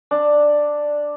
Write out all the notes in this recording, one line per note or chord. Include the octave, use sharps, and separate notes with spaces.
D4